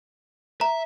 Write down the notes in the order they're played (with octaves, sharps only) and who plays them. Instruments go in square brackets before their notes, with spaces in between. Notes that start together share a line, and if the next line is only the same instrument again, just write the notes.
[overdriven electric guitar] E5 [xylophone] A#5